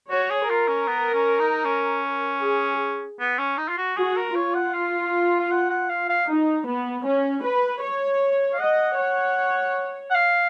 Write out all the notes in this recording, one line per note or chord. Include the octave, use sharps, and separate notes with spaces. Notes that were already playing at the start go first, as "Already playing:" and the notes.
F#4 C#5
G#4
F4 A#4
C#4
B3
C#4
D#4
C#4
G#4
B3
C#4
D#4
F4
F#4
F#4 G#4
A#4
F4 C#5
F#5
F5
F5
F#5
F#5
F5
F5
D#4
B3
C#4
B4
C#5
F5
D#5 F#5
C#5
F#5
F5